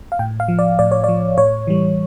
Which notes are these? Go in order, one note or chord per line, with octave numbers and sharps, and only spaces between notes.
F5
A2 G5
F5
F3
D5
A2 D5
C#5
F3 D5
A2 C#5
E3 G3